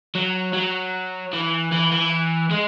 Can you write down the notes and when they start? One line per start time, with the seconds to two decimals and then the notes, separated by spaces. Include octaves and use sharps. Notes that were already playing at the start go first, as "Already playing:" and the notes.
0.15 F#3
0.53 F#3
1.33 E3
1.72 E3
1.92 E3
2.51 G#3